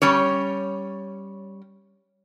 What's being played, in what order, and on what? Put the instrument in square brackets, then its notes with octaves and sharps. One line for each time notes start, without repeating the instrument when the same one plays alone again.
[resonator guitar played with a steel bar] G3 C#4 C#5